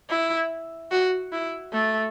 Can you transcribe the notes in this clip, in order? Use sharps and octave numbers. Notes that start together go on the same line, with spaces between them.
E4
F#4
E4
A3